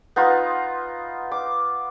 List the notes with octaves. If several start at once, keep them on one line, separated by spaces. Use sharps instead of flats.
B3 D#4 F4
D6